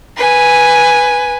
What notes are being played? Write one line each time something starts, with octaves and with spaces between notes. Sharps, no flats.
B4 G#5